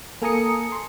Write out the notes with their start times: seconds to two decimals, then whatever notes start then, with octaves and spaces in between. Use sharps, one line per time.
0.22 A#3 A4 G#5 A#5 D#6 C#7
0.72 C6